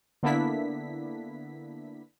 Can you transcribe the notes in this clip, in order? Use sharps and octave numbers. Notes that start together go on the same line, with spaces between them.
D3 A#3 B3 D4 E4 B6